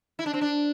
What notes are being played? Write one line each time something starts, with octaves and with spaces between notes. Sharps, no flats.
E4
D4
C4
D4